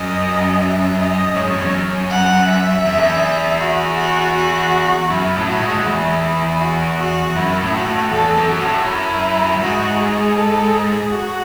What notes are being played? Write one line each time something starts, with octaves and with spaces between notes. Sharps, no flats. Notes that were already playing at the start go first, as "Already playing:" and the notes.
Already playing: F#2 D#5
E5
D#5
G#2 C#5
F#2
E2
F#2
F#5
E5
E2
F#2
E2
F#4
F#4
F#4
F#2 E4
A2
F#4
G#2
A2
G#2
E2 E4
F#4
F#4
F#2 E4
A2
F#4
A2
E2 A4
F#2
F#4
A2
F#2 E4
F#2
G#2 F#4
G#4
A4
G#4
F#4